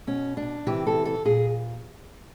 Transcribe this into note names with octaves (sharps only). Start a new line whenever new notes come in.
B2 C#4
D4
C3 E3 G4
A4
A4
A#2 G#4